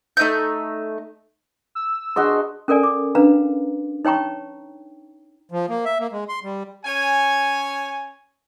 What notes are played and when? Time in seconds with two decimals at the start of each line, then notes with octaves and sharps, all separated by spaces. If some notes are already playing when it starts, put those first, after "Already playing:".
0.17 A3 D#4 E5 G6
1.75 E6
2.16 D4 F#4 G#4 D#5 C6
2.68 C#4 A4 A#4 D5 G#5
2.83 D6
3.15 C#4 D4 B4 F5 A#5
4.05 D#4 C#5 G5 A#5 C#6
5.52 F3
5.69 A#3
5.85 E5
6.00 A#3
6.12 G#3
6.29 C6
6.43 G3
6.85 C#4 C#5 G#5